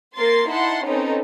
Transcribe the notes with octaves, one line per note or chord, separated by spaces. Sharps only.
A#3 A#4 C6 A6 C7
D#4 E4 F#5 A5 C6
C4 C#4 D#4 A4 B4